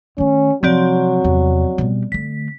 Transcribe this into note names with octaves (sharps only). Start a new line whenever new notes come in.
D#3 A3 C#4
C3 F3 F#3 G#3 C4 D5
E2 C3
B2 G3
D3 A3 B6